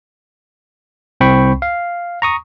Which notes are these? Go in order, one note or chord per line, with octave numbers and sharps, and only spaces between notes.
C2 C4 G5 B5 C#6
F5
A#5 C#6 D#6